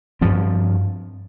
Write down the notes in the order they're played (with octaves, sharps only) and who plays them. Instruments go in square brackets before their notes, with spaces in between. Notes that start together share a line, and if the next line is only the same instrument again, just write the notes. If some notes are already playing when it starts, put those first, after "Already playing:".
[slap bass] G2 F3 C4